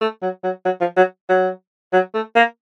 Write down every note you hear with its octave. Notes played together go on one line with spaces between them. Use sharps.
A3
F#3
F#3
F#3
F3
F#3
F#3
F#3
A3
A#3